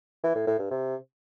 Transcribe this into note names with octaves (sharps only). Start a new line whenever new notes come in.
E3
A2
A2
G2
C3